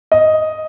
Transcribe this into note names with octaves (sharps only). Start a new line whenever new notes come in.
D#5